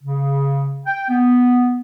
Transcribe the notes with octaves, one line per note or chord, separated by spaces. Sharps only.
C#3
G5
B3